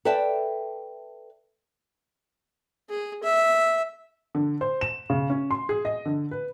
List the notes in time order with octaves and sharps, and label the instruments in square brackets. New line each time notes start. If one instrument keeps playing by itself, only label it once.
[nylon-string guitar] A4 B4 D5 E5 G5 A5
[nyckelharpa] G#4
E5
[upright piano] D3
C5
E7
C#3
C#4
C6
G#4
D#5
D3
B4